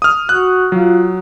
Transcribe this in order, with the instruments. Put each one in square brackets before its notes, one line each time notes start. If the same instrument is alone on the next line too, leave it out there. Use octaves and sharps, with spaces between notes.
[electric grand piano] D#6 F6
[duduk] F#4 [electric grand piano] F#6
[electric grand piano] F#3 [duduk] F4